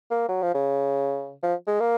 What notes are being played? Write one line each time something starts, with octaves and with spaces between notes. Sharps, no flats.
A#3
F#3
F3
C#3
F3
G#3
A#3